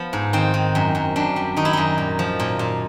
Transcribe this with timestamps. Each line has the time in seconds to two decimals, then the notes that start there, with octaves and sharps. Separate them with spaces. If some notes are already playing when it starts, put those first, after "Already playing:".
Already playing: F3 B3
0.13 G#2
0.33 D#3 C4
0.54 D#3
0.75 F#2
0.95 F#2
1.16 F#2 D4
1.36 G3
1.56 D#3 D#4
1.65 E4
1.73 F#2 D#4
1.98 A#2
2.19 F3
2.40 A#2
2.59 A#2